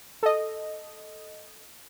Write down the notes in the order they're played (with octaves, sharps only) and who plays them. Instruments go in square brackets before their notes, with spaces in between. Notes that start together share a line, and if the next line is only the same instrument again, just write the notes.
[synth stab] A4 D#5